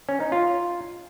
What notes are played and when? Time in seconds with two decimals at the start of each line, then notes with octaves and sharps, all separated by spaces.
0.09 C#4
0.20 D#4
0.32 F4